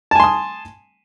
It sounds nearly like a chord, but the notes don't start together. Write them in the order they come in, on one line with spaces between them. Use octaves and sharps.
A5 G#5 C6 D#6